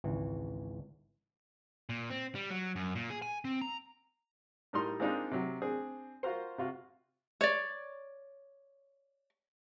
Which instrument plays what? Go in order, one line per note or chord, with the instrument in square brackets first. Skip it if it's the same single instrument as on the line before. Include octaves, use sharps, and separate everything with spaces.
[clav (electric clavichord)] G#1 C#2 E3
[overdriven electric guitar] A#2
C4
G3
F#3
F#2
A#2
G#4
G#5
C4
A#5
[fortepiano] A2 G3 D#4 A#4 C6
G#3 A#3 C4 D4 D#4 F4
C3 F#3
C4 D4 G#4
F4 F#4 A#4 C5
C3 F4 F#4
[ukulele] C#5 D5